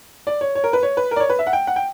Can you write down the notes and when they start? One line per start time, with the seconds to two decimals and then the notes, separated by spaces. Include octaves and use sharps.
0.27 D5
0.41 C#5
0.55 C#5
0.64 A#4
0.73 B4
0.83 C#5
0.97 B4
1.11 A#4
1.16 D5
1.20 C#5
1.29 B4
1.39 E5
1.47 F#5
1.53 G5
1.67 F#5
1.76 G5